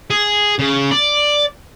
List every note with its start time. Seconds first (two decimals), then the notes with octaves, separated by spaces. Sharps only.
0.11 G#4
0.59 C#3
0.91 D5